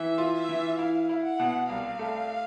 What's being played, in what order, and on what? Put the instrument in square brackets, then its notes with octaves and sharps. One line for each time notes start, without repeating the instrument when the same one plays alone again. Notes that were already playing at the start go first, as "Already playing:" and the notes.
Already playing: [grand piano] E3 [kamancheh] E5
[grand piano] F4
[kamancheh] E5
[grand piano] E3
[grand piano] E4 [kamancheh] F5
[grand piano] E4
[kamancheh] F#5
[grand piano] B2
[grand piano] C2 [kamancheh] F5
[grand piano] A3